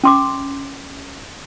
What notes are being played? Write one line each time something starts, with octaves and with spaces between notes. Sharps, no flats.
C#4 C6 D6